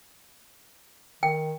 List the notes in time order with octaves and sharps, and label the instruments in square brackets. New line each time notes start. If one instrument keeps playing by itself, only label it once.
[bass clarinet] D#3 [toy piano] G5